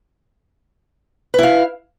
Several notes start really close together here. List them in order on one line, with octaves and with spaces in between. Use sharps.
B4 E4 F5